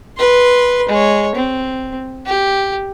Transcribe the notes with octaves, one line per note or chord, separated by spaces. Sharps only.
B4 C6
G#3 C#5
C4
G4